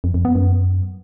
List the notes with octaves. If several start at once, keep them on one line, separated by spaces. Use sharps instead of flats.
F2
F2
B3
F#2